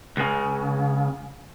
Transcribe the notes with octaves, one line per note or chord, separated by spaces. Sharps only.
C#2 C#3